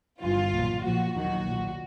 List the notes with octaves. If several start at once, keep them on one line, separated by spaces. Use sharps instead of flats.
G1 G2 E3 F4
B1 A#2 F#3
A#1 A#2 F3 F#4
D#2 D#3 F#3 F#4
B1 A#2 F#3